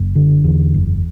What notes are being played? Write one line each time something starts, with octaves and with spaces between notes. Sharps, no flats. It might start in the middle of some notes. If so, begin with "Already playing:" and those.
Already playing: F#1
D3
E2
F#1